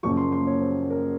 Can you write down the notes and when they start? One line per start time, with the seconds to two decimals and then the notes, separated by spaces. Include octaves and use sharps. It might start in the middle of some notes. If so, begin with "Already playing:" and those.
0.03 F#1 F#2 F3 A#3 C#6
0.17 C6
0.32 C6
0.47 C#5
0.61 C5
0.90 A#4